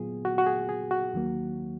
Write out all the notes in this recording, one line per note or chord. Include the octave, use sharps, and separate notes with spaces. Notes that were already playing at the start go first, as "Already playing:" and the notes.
Already playing: A#2 F#3 B3 F4 G#4
F#4
F#4
G#4
G#4
F#4
D#2 D#3 F#3 A#3